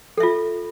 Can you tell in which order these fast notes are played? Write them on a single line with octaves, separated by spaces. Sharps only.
A4 E5 F4